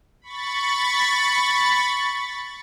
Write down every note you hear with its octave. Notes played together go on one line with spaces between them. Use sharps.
B5 C#6 A6